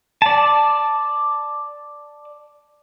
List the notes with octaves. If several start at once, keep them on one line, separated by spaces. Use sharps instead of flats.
D5 A5